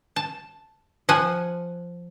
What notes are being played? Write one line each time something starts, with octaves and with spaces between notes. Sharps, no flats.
A5
F3 F#5 G#5